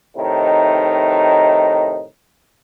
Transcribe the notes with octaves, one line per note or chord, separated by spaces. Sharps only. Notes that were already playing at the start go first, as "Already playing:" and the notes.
A2 C3 D#3 D#4